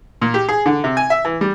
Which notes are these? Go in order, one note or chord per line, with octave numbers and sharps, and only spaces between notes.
A#2
G4
G#4
D3
C3
G#5
E5
E3
G3